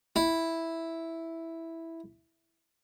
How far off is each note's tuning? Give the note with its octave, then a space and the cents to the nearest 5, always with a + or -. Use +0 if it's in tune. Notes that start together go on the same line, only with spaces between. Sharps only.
E4 -5